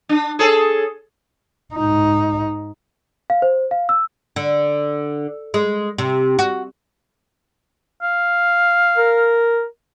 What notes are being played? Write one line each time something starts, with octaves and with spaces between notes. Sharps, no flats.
D4
G#4 A4 C#5
G#2 D#4
F5
C5
F5
E6
D3
G#3
C3
F#4
F5
A#4